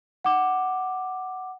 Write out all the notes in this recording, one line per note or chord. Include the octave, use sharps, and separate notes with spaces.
F#5 D6